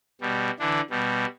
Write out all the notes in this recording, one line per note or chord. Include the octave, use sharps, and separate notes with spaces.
B2 G3
D3 E3 D4
B2 G3